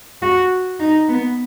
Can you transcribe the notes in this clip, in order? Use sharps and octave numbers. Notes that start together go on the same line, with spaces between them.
F#4
D#4
B3